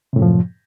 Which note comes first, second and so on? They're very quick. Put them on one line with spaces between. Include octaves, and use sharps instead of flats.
C3 A2 F#2 F3